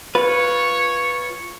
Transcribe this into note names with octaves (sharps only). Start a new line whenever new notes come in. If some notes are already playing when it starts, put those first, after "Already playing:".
F4 B4 C#5